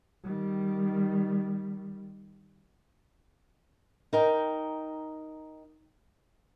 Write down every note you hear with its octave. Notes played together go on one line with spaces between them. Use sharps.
D#3 G3
D#4 A#4 G5